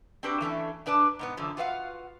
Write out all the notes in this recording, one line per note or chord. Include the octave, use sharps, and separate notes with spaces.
C4 D4 F#4 G4 B4
E3 A3 C#4 D4
A#2 D4 B4 D5 A5
G#2 B2 B3
F#2 D3 E3 F3
F4 F#4 B4 D5 F5 F#5